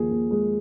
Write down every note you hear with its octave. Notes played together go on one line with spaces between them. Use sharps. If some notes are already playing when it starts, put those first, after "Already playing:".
Already playing: D#2 F3 G#4
D#2
G#3